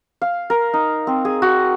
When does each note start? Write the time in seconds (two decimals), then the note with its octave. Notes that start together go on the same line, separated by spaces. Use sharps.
0.22 F5
0.50 A#4
0.73 D#4
1.07 C4
1.25 G#4
1.42 F#4